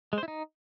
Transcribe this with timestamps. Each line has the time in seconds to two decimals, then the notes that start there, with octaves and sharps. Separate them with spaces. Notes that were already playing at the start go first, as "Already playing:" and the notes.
0.13 G#3
0.18 C5
0.23 E4
0.28 D#4